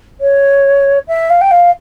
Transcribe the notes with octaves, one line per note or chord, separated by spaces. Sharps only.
C#5
E5
F5
G5
F5